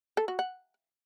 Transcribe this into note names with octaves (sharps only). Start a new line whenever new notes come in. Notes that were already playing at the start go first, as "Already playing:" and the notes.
A4
F#4
F#5